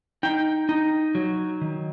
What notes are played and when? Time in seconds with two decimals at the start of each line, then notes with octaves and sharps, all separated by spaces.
0.23 D#4 G5
0.69 D#4
1.15 F#3
1.61 D#3